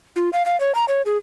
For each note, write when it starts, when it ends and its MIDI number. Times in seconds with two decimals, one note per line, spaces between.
0.16 0.30 65
0.33 0.45 77
0.46 0.58 77
0.60 0.74 73
0.75 0.85 82
0.88 1.02 73
1.06 1.17 68